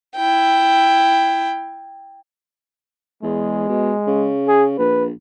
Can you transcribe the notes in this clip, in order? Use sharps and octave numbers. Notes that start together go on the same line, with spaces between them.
E4 G5
E2 G#3
B2
C#3
G#4
A#1 B4